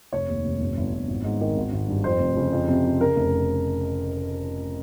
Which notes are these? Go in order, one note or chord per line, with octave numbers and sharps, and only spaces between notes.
F1 C#5
D#2
F1
G1
G1
G1
G#1
G#2
D#3
G#1
G#1
G2
F2 C5
F1
C#3
F2
C3
C3
C#3 A#4
F1